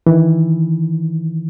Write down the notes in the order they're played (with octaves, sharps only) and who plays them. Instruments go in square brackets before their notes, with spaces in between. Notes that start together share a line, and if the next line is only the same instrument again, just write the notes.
[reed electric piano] D#3 E3